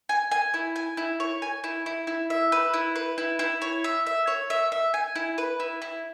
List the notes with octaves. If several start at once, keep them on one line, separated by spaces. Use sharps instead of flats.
G#5
G#5
E4
G#5
E4
C#5
G#5
E4
E4
E4
E5
B4
E4
B4
E4
E4
C#5
E5
E5
C#5
E5
E5
G#5
E4
B4
E4
E4